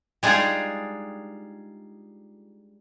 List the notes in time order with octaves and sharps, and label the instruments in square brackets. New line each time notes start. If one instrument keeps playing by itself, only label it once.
[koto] G3 G#3 D4 D#4 F4 G#4